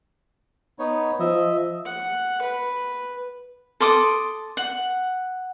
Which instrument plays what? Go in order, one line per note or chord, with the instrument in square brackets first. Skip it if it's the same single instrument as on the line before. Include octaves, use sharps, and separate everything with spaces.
[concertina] B3 D#4 C#5
[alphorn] F3 [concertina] D#5 E5
[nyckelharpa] F#5
B4
[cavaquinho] A4 C6 D6 D#6
F#5